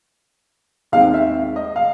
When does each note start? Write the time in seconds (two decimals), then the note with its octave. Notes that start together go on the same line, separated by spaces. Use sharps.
0.92 D#2 D#3 G#3 C4 F5
1.14 E5
1.56 D#5
1.76 F5